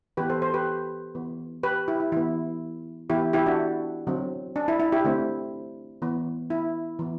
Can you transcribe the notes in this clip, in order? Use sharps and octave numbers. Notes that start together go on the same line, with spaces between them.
E3 B3 G4 B4
A4 C5
A4 C5
G4 B4
E3 B3
G4 B4
E4 G4
E4
E3 B3 E4
E3 B3 E4 G4
E4 G4
D4 F#4
D3 F#3 C4
D4
E4
E4
E4 G4
D3 A3 C4
E3 B3
E4
E3 B3